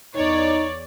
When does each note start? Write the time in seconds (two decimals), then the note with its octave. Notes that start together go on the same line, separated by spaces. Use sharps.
0.16 E2 D#4 C#5 D5